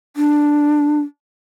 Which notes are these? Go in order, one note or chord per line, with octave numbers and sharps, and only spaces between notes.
D4